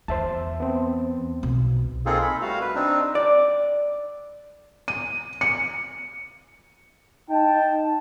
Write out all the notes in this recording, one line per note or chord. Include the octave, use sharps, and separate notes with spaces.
E2 C5 E5 A5
B3 C4
B1
A#3 C4 D#4 F4 G#4 A4
B5
G3 A3 F#4 F5
B4
C4 D4 D#4
D5
D#7
C#7
D#4 G5 A5